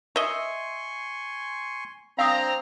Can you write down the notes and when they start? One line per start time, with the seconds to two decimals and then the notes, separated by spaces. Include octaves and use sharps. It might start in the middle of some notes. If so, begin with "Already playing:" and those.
0.16 D#5 E5 G#5 C6 C#6
2.19 C4 D4 F5 A#5 D#6